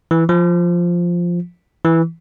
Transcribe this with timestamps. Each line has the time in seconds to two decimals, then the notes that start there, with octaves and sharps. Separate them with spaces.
0.11 E3
0.29 F3
1.85 E3